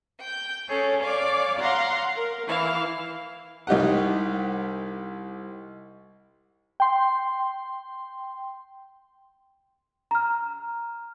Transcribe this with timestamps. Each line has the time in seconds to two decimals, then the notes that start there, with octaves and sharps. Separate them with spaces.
0.18 G5 G6
0.68 C#4 G#4 A4 C#5
1.01 C#5 D5 F5 D6
1.59 F5 F#5 A#5 C6
2.14 A#4
2.47 E3 E4 F5
3.67 C2 D#4 G4 F#5
6.80 G5 C6
10.11 A#5 F6